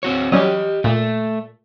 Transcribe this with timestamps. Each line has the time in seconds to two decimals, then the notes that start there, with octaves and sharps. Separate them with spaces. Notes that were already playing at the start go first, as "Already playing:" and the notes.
0.03 C4 F#4 C#5
0.32 F#3 G3 C#4 G4 D#5
0.84 A#2 A3